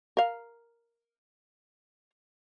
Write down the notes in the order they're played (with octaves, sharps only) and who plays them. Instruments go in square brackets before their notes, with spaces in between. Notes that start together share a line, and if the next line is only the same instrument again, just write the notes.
[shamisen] A#4 F5